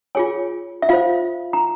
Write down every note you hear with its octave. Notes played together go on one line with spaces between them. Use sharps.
F4 G#4 C#5 G#5
E5
F4 C5 F5
A#5